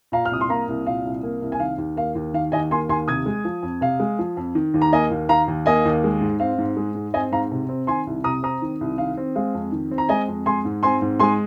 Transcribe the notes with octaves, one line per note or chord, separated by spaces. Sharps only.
A#2 F5 A#5
F6
C2 D#6
C6
A#3 F5 A#5
C2
A#2 F5
C2
A#3
C2
G#5
D#3 F5
D#2
A#3 F5
D#2
D#3 F5
D#2 D#5 G#5
A#3 G#5 C6
D#2 G#5 C6
C3 D#6 G#6
G#3
F3
F2
C3 F5
G#3
F3
F2
D#3
D#2
A#5
A#3 D#5 G#5
D#2
D#3 F5 A#5
D#2
A#3 D#5 G#5
D#2
G#3
G#2
C4 F5
G#2
G#3
G#2
C4 D#5 G#5
G#2 F5 A#5
C3
C4
D#3 G#5 C6
C2
C3 A#5 D#6
C4 A#5 D#6
D#3
C2
D#3 F5
C4
G#3 F5
F2
D#3
C4
A#5
G#3 D#5 G#5
F2
G#3 G#5 C6
G#2
C4 G#5 C6
G#2
G#3 G#5 C6